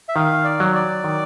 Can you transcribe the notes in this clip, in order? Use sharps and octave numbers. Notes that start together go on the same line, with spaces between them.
E5
D#3 F5
D5
F#3
D5
D#3